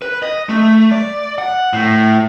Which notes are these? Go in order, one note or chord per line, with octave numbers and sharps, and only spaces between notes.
B4
D#5
A3
D5
F#5
A2